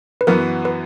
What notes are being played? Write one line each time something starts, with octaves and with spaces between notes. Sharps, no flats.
B4
F#2 E3 B3 F#4 A#4
B4